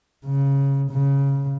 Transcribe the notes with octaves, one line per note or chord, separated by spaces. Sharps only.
C#3
C#3